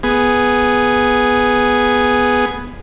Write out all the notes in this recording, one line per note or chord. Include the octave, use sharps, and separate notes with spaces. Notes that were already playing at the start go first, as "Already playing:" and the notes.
B3 G#4